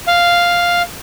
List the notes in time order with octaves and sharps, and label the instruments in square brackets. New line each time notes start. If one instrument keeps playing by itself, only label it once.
[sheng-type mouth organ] F5